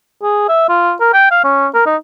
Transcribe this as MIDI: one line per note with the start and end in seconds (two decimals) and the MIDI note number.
0.23 0.44 68
0.49 0.68 76
0.69 0.93 65
1.00 1.09 70
1.14 1.27 79
1.31 1.40 77
1.44 1.68 61
1.74 1.83 70
1.86 1.96 63